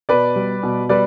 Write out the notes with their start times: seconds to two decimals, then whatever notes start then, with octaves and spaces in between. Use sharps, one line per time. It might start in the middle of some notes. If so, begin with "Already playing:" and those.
0.09 B2 B4 D5
0.36 G3
0.63 B2
0.89 G3 B4 D5